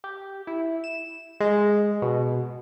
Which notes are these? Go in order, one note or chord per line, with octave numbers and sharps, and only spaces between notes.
G4
E4
E7
G#3
B2